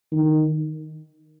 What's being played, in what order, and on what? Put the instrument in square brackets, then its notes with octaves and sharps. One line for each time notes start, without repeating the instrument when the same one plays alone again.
[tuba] D#3